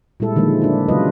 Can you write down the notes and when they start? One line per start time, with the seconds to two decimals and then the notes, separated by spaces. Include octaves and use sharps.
0.20 A#2 G3 G#3 E4 A4
0.36 D3 D#3 F3 G#3 A#3
0.62 D4 E4
0.88 C#3 F#3 G#3 F4 B4 D#5